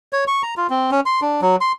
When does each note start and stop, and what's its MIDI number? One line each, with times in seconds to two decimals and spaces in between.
0.13 0.24 73
0.27 0.42 85
0.43 0.54 82
0.57 0.67 65
0.70 0.90 60
0.91 1.00 61
1.06 1.20 84
1.22 1.40 62
1.42 1.56 54
1.61 1.72 84